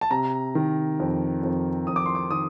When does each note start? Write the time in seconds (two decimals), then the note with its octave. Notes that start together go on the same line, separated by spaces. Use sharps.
0.01 A5
0.11 C3 A#5
0.55 D#3
1.00 F2
1.43 F2
1.87 F2 D#6
1.96 D6
2.06 C6
2.15 D6
2.31 D#3 D#6